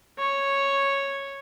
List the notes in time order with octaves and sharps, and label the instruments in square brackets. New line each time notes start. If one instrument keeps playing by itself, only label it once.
[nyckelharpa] C#5